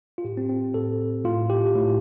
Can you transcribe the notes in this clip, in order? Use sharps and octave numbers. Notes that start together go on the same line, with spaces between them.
F4
A2 G4
C4
C4
A2 A4
A2 F4
G4
A2